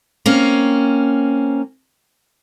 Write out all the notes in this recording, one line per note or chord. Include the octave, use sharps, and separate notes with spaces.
A#3 C4 C#4